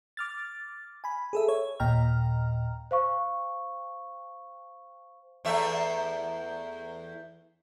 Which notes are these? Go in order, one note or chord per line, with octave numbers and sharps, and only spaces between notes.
D6 F6 A6
G#5 B5
G#4 A4 E5
C#5
D#2 A#2 D#5 G5 A#5 F6
C5 F5 C#6
E2 A3 E5